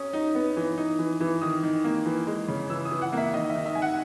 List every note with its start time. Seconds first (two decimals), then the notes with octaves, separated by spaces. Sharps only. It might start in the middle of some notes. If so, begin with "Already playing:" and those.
Already playing: C#4 D#6
0.13 D#4
0.35 B3
0.56 E3
0.78 D#4
0.99 E3
1.20 E3
1.41 D#3 D#6
1.63 D#3
1.84 A#3
2.06 E3
2.27 G#3
2.48 C#3
2.70 E3 E6
2.85 D#6
2.91 E3
3.02 F#5
3.12 A#3
3.18 E5
3.33 D#3 D#5
3.50 E5
3.55 D#3
3.66 E5
3.75 D#3 G#5
3.82 F#5